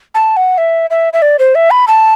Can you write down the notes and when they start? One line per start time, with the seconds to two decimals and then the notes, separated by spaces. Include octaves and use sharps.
0.15 A5
0.37 F#5
0.58 E5
0.90 E5
1.13 E5
1.22 D5
1.39 C5
1.55 E5
1.71 B5
1.88 A5